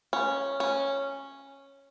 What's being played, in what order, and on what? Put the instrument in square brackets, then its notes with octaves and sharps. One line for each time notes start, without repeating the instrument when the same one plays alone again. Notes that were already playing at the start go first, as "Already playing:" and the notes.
[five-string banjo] C#4
C#4